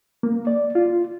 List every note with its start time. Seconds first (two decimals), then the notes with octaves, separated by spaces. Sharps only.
0.23 A#3
0.47 D5
0.75 F4